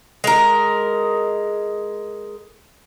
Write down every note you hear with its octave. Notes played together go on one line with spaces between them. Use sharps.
G#3 A#4